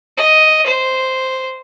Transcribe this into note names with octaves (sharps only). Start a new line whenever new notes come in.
D#5
C5